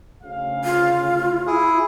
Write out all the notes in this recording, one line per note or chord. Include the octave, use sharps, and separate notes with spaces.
D2 C#3 F5
F4
E4 G#4